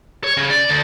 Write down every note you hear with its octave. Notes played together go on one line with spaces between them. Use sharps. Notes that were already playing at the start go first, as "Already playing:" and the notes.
C#5
C#3
D5
D2